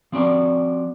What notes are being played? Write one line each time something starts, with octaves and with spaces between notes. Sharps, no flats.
F3 C4 F#4 D5